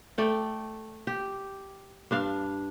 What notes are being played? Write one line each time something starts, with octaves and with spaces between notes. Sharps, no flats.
A3 D5 G5
G4
G2 D4 F5